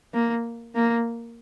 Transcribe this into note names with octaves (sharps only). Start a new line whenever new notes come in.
A#3
A#3